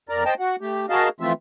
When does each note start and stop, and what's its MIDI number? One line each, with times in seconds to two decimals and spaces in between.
0.09 0.24 41
0.09 0.24 70
0.09 0.24 74
0.09 0.24 82
0.26 0.34 72
0.26 0.34 75
0.26 0.34 79
0.26 0.34 81
0.40 0.56 66
0.40 0.56 78
0.61 0.86 57
0.61 0.86 67
0.90 1.09 66
0.90 1.09 68
0.90 1.09 70
0.90 1.09 75
0.90 1.09 77
0.90 1.09 81
1.20 1.33 52
1.20 1.33 53
1.20 1.33 57
1.20 1.33 60
1.20 1.33 65
1.20 1.33 76